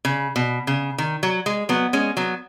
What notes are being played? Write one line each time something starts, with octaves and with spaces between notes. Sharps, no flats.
C#3
B2
C#3
D#3
F#3
G#3
F#3 B3
G#3 C#4
F#3 B3